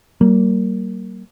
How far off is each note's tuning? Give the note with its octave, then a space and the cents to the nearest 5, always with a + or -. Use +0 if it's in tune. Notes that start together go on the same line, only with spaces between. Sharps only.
G3 -45 A#3 -10